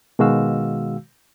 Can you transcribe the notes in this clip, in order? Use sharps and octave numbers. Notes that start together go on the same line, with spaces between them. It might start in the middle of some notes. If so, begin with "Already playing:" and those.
B2 D#3 G#3 F#4 F5 E6